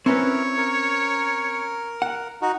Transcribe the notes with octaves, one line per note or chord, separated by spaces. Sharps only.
C4 C#4 E4 A#4 B4 C#5
A#4
F#5
D#4 F#4